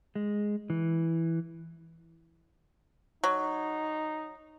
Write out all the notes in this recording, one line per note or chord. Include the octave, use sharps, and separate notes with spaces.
G#3
E3
F#3 D#4